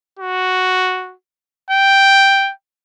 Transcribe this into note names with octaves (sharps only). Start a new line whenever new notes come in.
F#4
G5